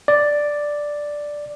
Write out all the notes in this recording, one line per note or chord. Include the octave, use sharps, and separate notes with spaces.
D5